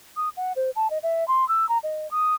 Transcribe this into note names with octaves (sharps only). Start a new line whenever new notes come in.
D#6
F#5
C5
A5
D#5
E5
C6
E6
A#5
D#5
D#6